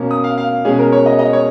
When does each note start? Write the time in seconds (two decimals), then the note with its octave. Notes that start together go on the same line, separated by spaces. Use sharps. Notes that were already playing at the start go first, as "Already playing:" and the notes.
Already playing: B2 A#3 C#4
0.11 D#6
0.24 F5
0.38 F5
0.65 B2 G#3 C#4 G#4
0.78 A#4
0.93 C#5
1.06 D#5
1.19 D#5
1.33 C#5